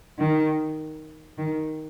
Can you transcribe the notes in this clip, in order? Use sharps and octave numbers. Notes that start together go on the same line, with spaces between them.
D#3
D#3